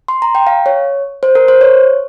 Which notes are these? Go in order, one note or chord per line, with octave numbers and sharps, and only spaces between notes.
C6
A#5
G5
F5
C#5
C5
A#4
C5
C#5